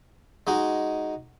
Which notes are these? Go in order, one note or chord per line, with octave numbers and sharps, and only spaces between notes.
G#3 D#4 F#4